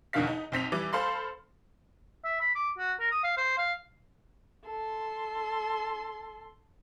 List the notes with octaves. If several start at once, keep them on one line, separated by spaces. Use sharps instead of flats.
E2 B2 D3 D#3 F5 B6
D#4
B1 C4 B6 F7
E3 G3 D6
A4 C5 F5 B5 C6
E5
B5
D6
F#4
A#4
D#6
F5
C5
F5
A4 C6